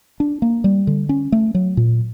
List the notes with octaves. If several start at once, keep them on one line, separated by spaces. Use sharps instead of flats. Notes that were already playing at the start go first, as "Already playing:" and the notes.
D4
A#3
G3
D3
C#4
A3
F#3
A#2